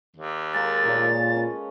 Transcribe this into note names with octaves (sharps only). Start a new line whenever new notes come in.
D#2
G#3 A#3 A4 A6
A#2 C#5
C#4 B4